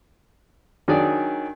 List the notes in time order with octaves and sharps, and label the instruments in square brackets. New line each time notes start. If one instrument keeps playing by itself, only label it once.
[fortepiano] D#3 F#3 D4 G#4 D5